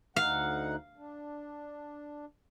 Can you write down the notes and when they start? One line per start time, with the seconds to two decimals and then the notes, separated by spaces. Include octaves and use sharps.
0.16 D2 D#4 F5 F#5
0.97 D4